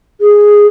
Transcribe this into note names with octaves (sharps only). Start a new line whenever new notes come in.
G#4